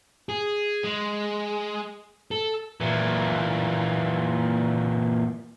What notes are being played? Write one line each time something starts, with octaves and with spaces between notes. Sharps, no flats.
G#4
G#3
A4
A#2 E3